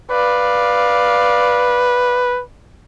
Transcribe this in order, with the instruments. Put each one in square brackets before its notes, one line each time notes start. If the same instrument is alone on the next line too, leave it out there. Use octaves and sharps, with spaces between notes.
[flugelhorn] B4 [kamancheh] D5 F5